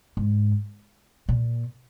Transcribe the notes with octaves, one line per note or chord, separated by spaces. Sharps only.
G#2
A#2